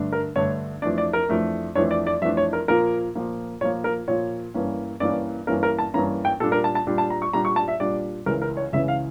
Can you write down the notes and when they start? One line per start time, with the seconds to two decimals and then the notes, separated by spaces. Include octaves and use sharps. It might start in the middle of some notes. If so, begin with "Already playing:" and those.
Already playing: G2 D3 A3 D4
0.12 A#4
0.36 G2 D3 A3 D4 C#5
0.82 F2 E3 A3 D4 D5
0.98 D5
1.13 A#4
1.29 F2 E3 A3 D4
1.75 F2 E3 A3 D4 C#5
1.91 D5
2.07 D5
2.21 F2 E3 A3 D4 E5
2.37 C#5
2.53 A#4
2.68 A#2 F3 A#3 A#4
3.15 A#2 F3 A#3
3.61 A#2 F3 A#3 C#5
3.84 A#4
4.08 A#2 F3 A#3 C#5
4.54 G2 E3 A#3 C#4
5.00 G2 E3 A#3 C#4 D5
5.47 G2 E3 A#3 C#4 A#4
5.63 A#4
5.79 A5
5.94 G2 E3 A#3 C#4 A#5
6.25 G5
6.40 A#2 G3 D4 A4
6.52 A#4
6.64 A5
6.75 A5
6.87 A#2 G3 D4
6.98 A5
7.10 A#5
7.22 C#6
7.33 A#2 G3 D4 A#5
7.45 C#6
7.56 A5
7.68 E5
7.80 A#2 G3 D4 D5
8.26 C#2 C#3 E3 A#4
8.42 A#4
8.57 C#5
8.73 C#2 C#3 E3 E5
8.88 F5